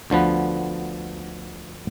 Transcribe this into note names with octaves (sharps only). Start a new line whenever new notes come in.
D2 D3 F3 B3 B4